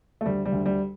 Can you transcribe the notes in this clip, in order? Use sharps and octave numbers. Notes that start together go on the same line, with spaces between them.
A3
D2 G3
G3
D2
G3